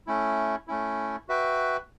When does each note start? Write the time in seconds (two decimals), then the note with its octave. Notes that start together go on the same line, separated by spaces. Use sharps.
0.07 A3 C#4 E4
0.68 A3 C#4 E4
1.29 F#4 B4 E5 G5